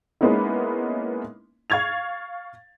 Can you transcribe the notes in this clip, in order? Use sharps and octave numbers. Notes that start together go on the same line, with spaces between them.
G#3 A#3 B3 C#4 D#4 E4
F5 C#6 G#6 A6 F7